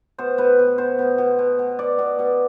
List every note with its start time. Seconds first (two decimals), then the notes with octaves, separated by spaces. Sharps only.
0.18 B2 C5
0.38 B2 B4
0.59 B2
0.78 B2 C5
0.99 B2
1.18 B2
1.39 B2
1.59 B2
1.79 B2 D5
1.99 B2
2.19 B2